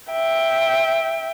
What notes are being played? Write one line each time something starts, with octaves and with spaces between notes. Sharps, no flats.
E5 G5